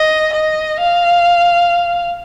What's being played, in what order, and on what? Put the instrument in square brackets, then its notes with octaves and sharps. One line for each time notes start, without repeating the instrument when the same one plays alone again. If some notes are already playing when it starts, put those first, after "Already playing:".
Already playing: [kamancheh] D#5
D#5
F5